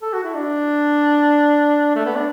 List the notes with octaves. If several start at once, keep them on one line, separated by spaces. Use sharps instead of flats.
A4
F#4
E4
D4
A3
B3
D4